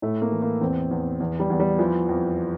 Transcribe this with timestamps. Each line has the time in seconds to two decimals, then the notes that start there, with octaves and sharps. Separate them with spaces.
0.02 A2 A3
0.22 A#3
0.31 E3
0.42 A#3
0.61 E2 C4
0.91 E2
1.20 E2
1.40 G3
1.50 E2
1.60 G3
1.79 E3 F3
2.09 F2